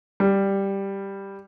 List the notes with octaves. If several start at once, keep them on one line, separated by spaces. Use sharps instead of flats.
G3